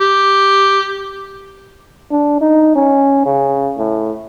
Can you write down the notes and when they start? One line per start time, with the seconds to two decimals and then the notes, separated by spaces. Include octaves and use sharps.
0.01 G4
2.11 D4
2.41 D#4
2.75 C#4
3.26 C#3
3.78 A2